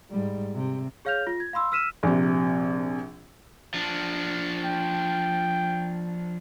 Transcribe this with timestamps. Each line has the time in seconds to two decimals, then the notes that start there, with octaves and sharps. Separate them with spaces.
0.11 G#2 G3
0.55 C3
1.05 G#4 C#5 F5 F6 G6 F7
1.27 F4 A#6
1.40 G#6
1.53 F5 B5 C6 E6
1.72 E6 F6 B6 D#7 E7
2.03 A#1 C3
3.74 F3 D4
4.64 G5